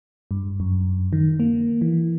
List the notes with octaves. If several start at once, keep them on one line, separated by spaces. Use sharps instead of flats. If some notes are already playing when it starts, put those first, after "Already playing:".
G2
F#2
D#3
A#3
E3